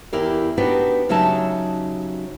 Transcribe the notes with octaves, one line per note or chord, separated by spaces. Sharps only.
E2 E4 G4 A#4 D5
B3 D4 D#4 F#4 G4 B4
C#3 F#3 D#4 G4 E5 A5